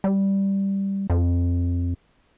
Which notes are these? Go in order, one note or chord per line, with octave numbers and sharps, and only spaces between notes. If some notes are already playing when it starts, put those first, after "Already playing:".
G3
F2